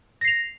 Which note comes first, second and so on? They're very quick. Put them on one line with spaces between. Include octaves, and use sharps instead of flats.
A#6 C7 F7